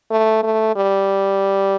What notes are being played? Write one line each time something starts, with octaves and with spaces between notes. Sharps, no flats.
A3
A3
G3